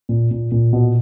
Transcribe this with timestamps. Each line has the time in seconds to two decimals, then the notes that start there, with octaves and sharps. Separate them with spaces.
0.09 A#2
0.31 A#2
0.52 A#2
0.73 B2